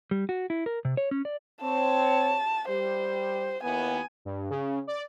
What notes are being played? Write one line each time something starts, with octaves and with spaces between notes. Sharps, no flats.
G3
F#4
E4
A#4
C3
C#5
C#4
D5
C4 C#5 A5
G3 G4 C5
D#2 B3 E4 G#5
G2
C#3
D5